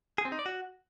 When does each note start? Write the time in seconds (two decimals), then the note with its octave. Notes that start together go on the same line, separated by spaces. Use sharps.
0.18 G#4
0.25 C4
0.32 D#4
0.39 D5
0.46 F#4